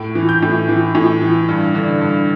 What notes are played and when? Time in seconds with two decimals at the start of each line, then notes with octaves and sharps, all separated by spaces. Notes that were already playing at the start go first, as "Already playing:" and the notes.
Already playing: A2 D7
0.15 E3
0.29 G6
0.43 A2
0.69 E3
0.95 A2
1.22 E3
1.48 G2
1.75 D3
2.01 G2